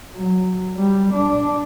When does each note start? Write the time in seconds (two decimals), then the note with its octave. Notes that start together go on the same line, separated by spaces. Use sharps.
0.15 F#3
0.76 G3
1.12 D4